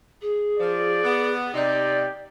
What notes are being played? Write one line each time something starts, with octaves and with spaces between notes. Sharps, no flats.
G#4
F3 D5
B3
C3 D#4 G4 D5